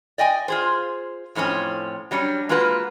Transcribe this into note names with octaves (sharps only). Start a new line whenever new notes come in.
D5 D#5 G5 G#5
F4 G#4 C5
F2 A2 F3 C4 C#4
F#3 G3 C#4 D4
G#3 A#3 F4 F#4 B4